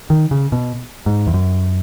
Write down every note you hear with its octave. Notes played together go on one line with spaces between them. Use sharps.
D#3
C#3
B2
G#2
E2
F#2